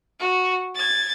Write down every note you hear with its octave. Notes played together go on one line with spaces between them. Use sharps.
F#4
G#6 A6